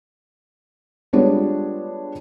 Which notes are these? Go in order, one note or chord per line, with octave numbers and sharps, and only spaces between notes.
G3 G#3 B3 D4 F4 C#5